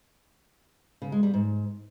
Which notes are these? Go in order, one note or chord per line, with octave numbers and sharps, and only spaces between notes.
C#3
G#3
G3
G#2